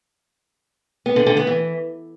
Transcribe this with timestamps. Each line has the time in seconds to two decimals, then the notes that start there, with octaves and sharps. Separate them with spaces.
1.06 B3
1.16 D3
1.26 D3
1.37 B3
1.47 E3